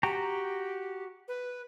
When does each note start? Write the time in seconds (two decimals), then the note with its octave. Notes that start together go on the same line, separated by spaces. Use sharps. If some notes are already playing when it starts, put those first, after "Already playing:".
0.03 F#4 G4 G5 A#5
1.28 B4